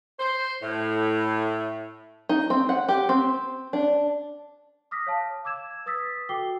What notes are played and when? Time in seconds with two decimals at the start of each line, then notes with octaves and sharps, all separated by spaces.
0.19 C5
0.63 A2
2.29 D#4
2.50 C4
2.69 F#5
2.89 G4
3.09 C4
3.73 D4
4.91 D6 D#6 F6 A#6 B6
5.07 C#5 F5 A5
5.45 D6 E6 G#6 E7
5.86 B4 D#6 E6 A6 B6
6.29 F#4 A4 G5 D6 C7 G7